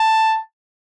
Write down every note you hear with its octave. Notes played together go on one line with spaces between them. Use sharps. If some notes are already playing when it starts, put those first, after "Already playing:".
Already playing: A5